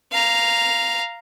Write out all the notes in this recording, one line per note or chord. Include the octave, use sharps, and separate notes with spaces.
F5 A#5